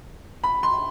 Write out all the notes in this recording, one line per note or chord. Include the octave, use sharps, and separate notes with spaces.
B5
C6